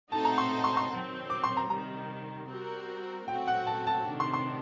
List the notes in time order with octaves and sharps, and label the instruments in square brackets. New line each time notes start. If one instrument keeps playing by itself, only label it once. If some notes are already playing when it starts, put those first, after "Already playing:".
[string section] A3 C4 D#4 F#4 A4 [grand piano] A5
[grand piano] A#5
C6
C6
C6
[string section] D#3 F#3 C4
[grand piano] D6
C6
A#5
[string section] C3 D#3 G3 [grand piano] A#5
[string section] G3 C4 F#4 A#4
[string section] F#3 A3 C4 F#4 [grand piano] G5
[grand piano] F#5
A5
A5
[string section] C3 D#3 A3 D4
[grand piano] C6
C6